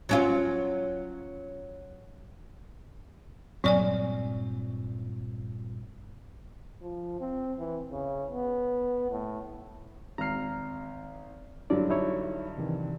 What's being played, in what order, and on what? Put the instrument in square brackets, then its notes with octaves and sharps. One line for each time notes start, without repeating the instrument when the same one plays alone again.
[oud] F#3 C#4 F4
[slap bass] G2 A#2 C4 [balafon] F#3 D5 G#5
[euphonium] F3
C4
E3
C#3
B3
A2
[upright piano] G#1 C7 [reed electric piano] A#5 F6
[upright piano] G2 D3 F#3 [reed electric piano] D5
[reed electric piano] D#4 E4 C#5
C3 D#3 E3